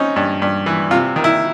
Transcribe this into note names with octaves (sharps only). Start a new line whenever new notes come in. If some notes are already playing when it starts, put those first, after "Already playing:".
Already playing: C4 C#4 D#4
G2
G2
E3
C3 F4
D#3
E4